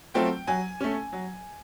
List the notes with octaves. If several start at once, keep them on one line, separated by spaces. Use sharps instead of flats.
F#3 A3 C4 F4 G5
F#3 G#5
A3 C#4
F#3